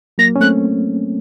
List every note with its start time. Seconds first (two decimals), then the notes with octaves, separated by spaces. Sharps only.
0.18 F#3 A#3 A#6
0.36 C#4
0.41 A3 C4 F#6